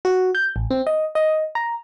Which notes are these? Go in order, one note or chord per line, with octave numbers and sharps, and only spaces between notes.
F#4
G6
A1
C4
D#5
D#5
A#5